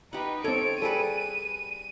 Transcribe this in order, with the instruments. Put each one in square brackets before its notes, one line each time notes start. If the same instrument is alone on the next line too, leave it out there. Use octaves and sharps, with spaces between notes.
[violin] D#4 B4 [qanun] G4 F#5
[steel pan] C4 A4 [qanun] C#5 [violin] D7
[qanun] G3 G#4 B4 [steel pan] A4 [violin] D#7